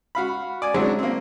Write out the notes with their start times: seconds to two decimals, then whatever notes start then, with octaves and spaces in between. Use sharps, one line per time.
0.15 F#4 F5 B5
0.62 D5 G#5
0.74 F#3 G#3 C4 D4 E4 F#4
0.99 A#3 C4